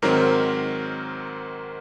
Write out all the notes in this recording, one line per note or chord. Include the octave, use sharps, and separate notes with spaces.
G#2 D#3 F#3 C4 A#4